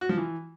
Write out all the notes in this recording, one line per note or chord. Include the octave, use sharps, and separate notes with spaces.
F#4
F3
E3